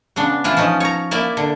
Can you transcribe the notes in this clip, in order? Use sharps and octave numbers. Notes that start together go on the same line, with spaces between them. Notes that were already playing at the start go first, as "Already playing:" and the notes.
C#3 B3 D4
E3 E4 F4
F3 C#4 D#4
C#5 A#5
A#3 E4 D5
D3